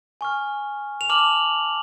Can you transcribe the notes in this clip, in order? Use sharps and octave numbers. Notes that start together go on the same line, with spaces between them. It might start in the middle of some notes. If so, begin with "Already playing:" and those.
G#5 C#6 F6
F7
A5 D6 F6 F#7